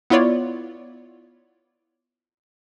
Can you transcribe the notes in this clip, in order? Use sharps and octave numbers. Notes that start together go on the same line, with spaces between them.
B3 E4 F4 C#5 D5